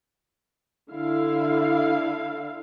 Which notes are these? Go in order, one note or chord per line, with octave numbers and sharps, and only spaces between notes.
D3 E4 F5